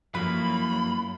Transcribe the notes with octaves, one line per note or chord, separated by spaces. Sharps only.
F#2 F3 F#3 A3 A#3 E4 B4 B5